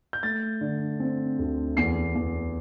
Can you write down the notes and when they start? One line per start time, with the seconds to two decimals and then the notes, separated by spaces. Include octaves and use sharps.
0.13 G6
0.23 A3 A6
0.61 D3
1.00 C4
1.39 D2
1.77 E2 C7
2.15 E2